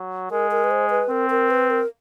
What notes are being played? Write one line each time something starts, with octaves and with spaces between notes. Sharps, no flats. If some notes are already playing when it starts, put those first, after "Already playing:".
Already playing: F#3
G#3 A#4
A#4
B4
C5
B4
C4 A#4
A#4
B4
A#4